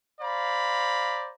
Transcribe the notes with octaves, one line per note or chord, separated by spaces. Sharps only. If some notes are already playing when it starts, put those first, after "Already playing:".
C5 D5 F5 A#5 B5